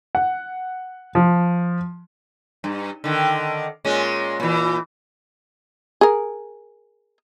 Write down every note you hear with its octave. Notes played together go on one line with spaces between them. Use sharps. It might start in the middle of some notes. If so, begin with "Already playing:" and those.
F#5
F3
G2
D3 D#3
A#2 G#3 C#4
A#2 E3
G#4 A#4